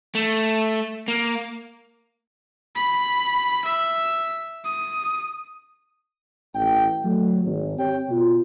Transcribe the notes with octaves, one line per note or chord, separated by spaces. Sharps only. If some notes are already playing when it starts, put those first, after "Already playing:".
A3
A#3
B5
E5
D#6
A1 G5
F#3 A3
G#1
C4 G4 C#5 G5
B2 F4